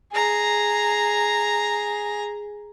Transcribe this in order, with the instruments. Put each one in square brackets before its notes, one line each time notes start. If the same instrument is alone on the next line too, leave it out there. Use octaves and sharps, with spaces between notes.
[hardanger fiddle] G#4 A#5